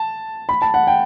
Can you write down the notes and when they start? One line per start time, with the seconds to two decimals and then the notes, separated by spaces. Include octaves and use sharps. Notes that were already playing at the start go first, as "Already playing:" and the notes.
Already playing: A5
0.49 B5
0.62 A5
0.74 F#5
0.87 G5